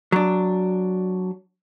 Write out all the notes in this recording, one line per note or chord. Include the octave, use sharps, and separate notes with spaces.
F#3 D4